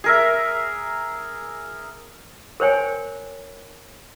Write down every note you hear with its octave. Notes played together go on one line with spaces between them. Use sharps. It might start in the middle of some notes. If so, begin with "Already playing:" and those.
G#4 A#4 E5
A#4 C5 C#5 G5 G#5